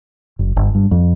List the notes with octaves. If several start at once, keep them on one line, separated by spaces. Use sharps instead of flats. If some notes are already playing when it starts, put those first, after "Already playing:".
F#1
G1
G2
F2